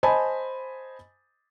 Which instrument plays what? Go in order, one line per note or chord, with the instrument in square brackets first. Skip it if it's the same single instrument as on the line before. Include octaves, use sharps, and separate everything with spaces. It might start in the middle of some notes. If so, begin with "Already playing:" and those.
[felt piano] C5 D#5 G#5 A5 B5